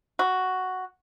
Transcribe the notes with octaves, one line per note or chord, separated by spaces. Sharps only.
F#4